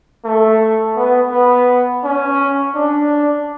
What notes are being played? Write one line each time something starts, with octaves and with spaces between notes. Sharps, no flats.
A3
B3
B3
C#4
D4